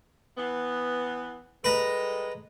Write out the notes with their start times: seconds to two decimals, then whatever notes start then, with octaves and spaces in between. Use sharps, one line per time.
0.37 E3 B3
1.64 G3 G#3 A4 B4 A#5